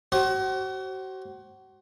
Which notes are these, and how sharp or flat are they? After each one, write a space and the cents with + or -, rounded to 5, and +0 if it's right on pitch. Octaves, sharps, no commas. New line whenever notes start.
F#4 +35 C5 +30